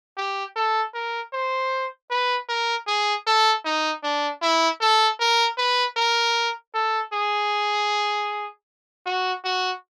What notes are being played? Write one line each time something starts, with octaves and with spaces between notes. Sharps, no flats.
G4
A4
A#4
C5
B4
A#4
G#4
A4
D#4
D4
E4
A4
A#4
B4
A#4
A4
G#4
F#4
F#4